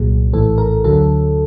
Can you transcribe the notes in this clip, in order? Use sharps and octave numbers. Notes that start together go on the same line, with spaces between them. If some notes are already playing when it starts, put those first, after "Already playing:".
Already playing: C2 A#2 F#3 G#4
A#1 A2 E3 A4
A#4
D2 D3 F#3 A4